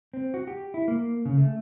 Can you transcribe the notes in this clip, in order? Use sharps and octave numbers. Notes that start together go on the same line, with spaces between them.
C4
F#4
G4
E4
A#3
C#3
A3